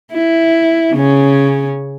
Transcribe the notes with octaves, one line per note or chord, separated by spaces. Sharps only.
E4
C#3 C#4